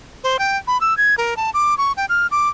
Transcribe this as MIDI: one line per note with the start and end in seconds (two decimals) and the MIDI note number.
0.23 0.37 72
0.39 0.57 79
0.67 0.80 83
0.81 0.96 88
0.97 1.15 92
1.18 1.36 70
1.37 1.50 81
1.54 1.77 86
1.78 1.92 85
1.97 2.05 79
2.09 2.27 89
2.31 2.48 86